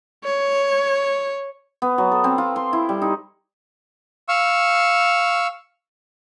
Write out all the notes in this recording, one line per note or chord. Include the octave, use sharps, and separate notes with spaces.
C#5
B3
F#3
A4
C4
F4
C6
E4
G3
D#4
F5 C#6 E6